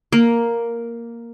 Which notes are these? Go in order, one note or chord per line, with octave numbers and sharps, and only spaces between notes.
A#3